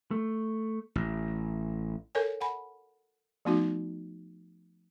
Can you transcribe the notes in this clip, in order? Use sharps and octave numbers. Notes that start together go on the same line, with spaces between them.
A3
A1
A4 A#4 C#5 G#5
F#5 G#5 B5
F3 A3 B3 D#4 F#4